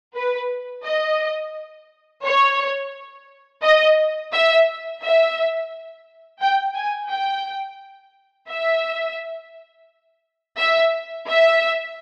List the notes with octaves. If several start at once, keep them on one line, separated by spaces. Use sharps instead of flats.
B4
D#5
C#5
D#5
E5
E5
G5
G#5
G5
E5
E5
E5